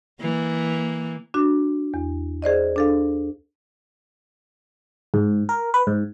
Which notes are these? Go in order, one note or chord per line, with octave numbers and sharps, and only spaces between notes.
E3 A#3
D4 F#4
E2
G#4 C5 D5 D#5
D4 A4 F5
G#2
A#4
B4
G#2